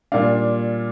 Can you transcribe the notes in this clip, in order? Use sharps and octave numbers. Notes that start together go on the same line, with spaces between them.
A#2 G3 D4 F5